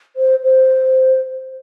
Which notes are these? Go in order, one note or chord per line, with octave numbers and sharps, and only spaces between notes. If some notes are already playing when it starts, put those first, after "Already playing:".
C5
C5